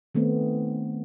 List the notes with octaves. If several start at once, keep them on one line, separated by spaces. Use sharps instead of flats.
D#3 A3 B3 C4